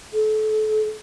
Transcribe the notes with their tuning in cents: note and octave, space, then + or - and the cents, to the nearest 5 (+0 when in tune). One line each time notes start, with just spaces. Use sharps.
A4 -30